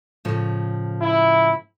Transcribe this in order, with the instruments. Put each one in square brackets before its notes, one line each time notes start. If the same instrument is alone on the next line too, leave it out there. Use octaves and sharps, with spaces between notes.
[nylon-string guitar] A2 C#3 F3
[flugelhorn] E4